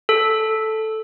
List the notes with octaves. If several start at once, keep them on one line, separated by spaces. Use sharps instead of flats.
A4